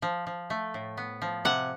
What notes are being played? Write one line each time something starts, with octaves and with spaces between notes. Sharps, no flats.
F3
F3
A3
A2
B3
F3
C3 F#5